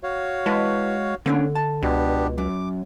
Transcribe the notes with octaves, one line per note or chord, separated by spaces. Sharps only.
F#4 C#5 F5
G#3 E4 B4 A5
D3 A#3 C#4 D4
A5
C#2 B2 B3 D4 G4
F#2 D6